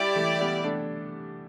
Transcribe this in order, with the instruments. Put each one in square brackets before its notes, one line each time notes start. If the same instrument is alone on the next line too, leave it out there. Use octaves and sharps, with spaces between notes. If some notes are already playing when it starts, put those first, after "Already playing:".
Already playing: [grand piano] G3 [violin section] E4 G4 D5
[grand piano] E3 A3
G3 B3
A3 D4